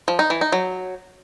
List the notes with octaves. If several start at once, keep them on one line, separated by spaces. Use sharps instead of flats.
F3
D#4
E3
D#4
F#3